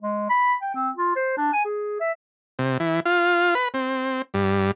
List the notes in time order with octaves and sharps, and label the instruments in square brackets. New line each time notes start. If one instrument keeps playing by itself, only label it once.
[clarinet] G#3
B5
G5
C4
F4
C5
D4
G#5
G#4
E5
[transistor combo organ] C3
E3
F4
B4
C4
G2